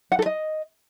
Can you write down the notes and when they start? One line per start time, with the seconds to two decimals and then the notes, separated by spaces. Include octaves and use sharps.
0.12 F#5
0.19 A4
0.26 D#5